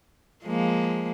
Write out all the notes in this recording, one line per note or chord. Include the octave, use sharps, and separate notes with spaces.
F3 G#3 A#3